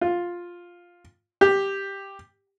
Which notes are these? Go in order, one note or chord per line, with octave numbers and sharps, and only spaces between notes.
F4
G4